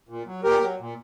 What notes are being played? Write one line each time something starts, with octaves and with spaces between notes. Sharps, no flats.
A#2
F#3
A#2 G4 A#4
F#3
A#2